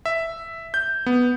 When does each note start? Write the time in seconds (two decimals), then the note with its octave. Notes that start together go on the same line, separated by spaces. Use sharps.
0.06 E5
0.74 G6
1.06 B3